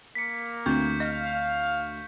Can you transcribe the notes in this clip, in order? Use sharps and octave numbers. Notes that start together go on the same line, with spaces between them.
A#3 B6 C#7
D2 C4 C#6 G6
D#5 F5